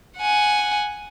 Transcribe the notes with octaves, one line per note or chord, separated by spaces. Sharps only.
F#5 G#5